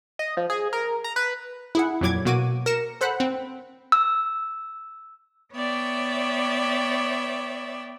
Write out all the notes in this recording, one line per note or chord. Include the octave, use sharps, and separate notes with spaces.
D#5
F3
G#4
A#4
A#5
B4
E4 G#4 F#5
F2 A#2 F#3 D6 G#6
B2 A#3 F#4 D6 D#7
A#4 A#6 C#7 E7
A4 C5 F#5 B5 F#6
C4
E6
B3 C#5 D5 E5 G5